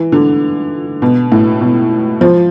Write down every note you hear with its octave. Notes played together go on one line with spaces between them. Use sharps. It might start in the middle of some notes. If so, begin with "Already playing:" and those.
Already playing: E3
D3
B2
A2
B2
F3